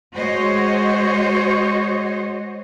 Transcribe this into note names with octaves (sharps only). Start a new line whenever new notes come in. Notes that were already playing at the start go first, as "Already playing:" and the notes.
G#3 F#4 C5 C#5 D#5